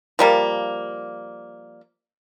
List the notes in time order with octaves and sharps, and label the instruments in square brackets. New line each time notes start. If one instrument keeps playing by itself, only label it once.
[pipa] F3 G3 A#3